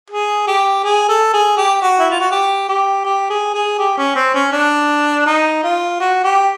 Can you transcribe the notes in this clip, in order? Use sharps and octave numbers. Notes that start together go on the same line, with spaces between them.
G#4
G4
G#4
A4
G#4
G4
F#4
E4
F4
F#4
G4
G4
G4
G#4
G#4
G4
C#4
C4
C#4
D4
D#4
F4
F#4
G4